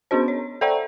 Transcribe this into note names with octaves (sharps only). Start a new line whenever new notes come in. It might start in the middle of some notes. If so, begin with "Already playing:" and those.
B3 C#4 D4 F#4 C5
C#5
A4 C5 D5 E5 G5 A#5